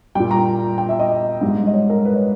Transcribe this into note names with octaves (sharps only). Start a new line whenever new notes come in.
A#2 G3 G5
A#5
G5
E5
D#5
G#2 G3
D#5
C#5
A#4
B4
C#5